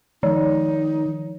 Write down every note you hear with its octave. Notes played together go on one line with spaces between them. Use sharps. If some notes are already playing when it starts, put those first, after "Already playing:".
D#3 F3 D#4